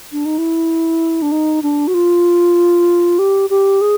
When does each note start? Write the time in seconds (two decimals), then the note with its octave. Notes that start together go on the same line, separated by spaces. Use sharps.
0.12 D4
0.25 D#4
0.38 E4
1.22 D4
1.32 D#4
1.63 D4
1.88 F#4
1.94 F4
3.19 G4
3.50 G4
3.81 G#4